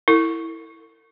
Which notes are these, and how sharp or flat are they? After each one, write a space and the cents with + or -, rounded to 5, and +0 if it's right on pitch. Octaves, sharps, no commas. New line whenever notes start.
E4 -5 A4 +45